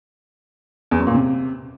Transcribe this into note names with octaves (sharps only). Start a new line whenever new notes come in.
E2
F#2
A#2
C3